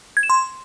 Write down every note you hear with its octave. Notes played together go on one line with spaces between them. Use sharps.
G#6
E7
C6